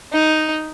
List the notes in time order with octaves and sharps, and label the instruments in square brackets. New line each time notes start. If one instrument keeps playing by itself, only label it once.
[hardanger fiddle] D#4